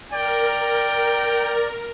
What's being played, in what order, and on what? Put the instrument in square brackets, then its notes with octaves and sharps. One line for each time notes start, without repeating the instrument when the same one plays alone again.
[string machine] A#4 [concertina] D5 [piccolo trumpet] G5